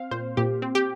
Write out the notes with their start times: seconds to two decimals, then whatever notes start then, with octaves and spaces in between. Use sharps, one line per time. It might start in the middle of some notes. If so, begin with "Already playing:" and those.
Already playing: C4 F5
0.11 A#2 C5
0.37 A#2 G4
0.62 C4
0.75 G4